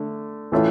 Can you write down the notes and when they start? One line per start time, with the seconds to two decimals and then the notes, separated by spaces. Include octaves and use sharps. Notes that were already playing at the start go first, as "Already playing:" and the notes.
Already playing: D3 A3
0.52 A2 E3 A3 C#4 F4